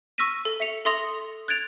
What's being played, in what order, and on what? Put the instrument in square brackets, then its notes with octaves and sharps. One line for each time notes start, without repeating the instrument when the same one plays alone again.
[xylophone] C#6 E6 F6 A#6 B6 D#7
A4
E5 B6 C#7 F7
A4 E5 C6 D#6 A#6 F7
F#6 G#6 A6 D7 F7